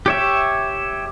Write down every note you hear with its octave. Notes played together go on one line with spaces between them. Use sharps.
G4 C#5 E5